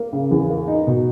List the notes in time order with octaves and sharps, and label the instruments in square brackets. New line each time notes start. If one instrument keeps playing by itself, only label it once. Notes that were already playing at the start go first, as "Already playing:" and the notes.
Already playing: [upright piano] A#3
C#3
E2
A#3
D#4
B2